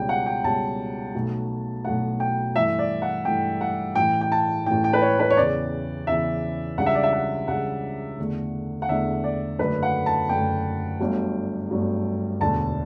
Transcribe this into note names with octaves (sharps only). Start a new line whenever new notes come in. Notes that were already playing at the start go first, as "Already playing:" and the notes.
Already playing: C#2 B2 G3 C#4 G5
F#5
G5
C#2 B2 G3 C#4 A5
B1 B2 F#3 A3
B1 B2 F#3 A3 F#5
G5
G2 E3 A3 E5
D5
F#5
G2 E3 A3 G5
F#5
A1 A2 E3 G5
G5
A5
A1 A2 E3 G5
G5
B4
C#5
B4
C#5
E2 C#3 E3 D5
E2 C#3 E3 E5
C#2 C#3 G3 D4 F#5
E5
D5
E5
F#5
C#2 C#3 G3 D4 F#5
E2 D3 A3 D4
F#5
E2 D3 A3 D4 E5
D5
F#1 F#2 D3 A3 B4
F#5
A5
F#1 F#2 D3 A3 G5
G1 G2 F#3 A3 D4
G1 G2 F#3 A3 D4
E1 D2 D3 A5